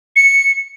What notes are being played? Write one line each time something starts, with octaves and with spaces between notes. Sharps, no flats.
C#7